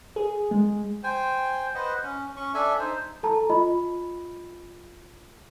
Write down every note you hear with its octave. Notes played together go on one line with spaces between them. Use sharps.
G#4
G#3
C5 G5 G#5
B4 C5 D#5 F#5
C#4
C#4 C#6
D4 A4 E5 G#5
D#4 C5
A4 A5 A#5
F4 D#5 B5